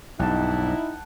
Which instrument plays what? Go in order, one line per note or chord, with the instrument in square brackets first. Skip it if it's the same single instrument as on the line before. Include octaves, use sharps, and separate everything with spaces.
[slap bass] B1 G2 [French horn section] D#4 E4 [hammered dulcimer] F#5 G5 A5